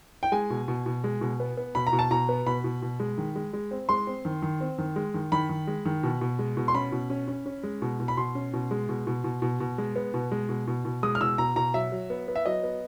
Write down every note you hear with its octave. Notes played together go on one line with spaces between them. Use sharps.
G5
G#3 G#5
B2
B2
B2
G#3
B2
B3
B3
B2 B5
A#5
B2
A5
B2 A#5
B3
B2 B5
B2
B2
G#3
D#3
G#3
G#3
C4
G#3 C6
C4
D#3
D#3
C4
D#3
G#3
D#3
D#3 B5
D#3
G#3
D#3
B2
B2
G#3
B2
C6
C#4 B5
B2
C#4
C#4
C#4
G#3
B2
B2
B5
B2 C6
C#4
B2
G#3
B2
B2
B2
B2
B2
G#3
B3
B2
G#3
B2
B2
B2
G#3 D#6
F6
B2 E6
B2 A#5
B2 A#5
F#3 E5
F#3
B3
B3
E5
F#3 D#5
B3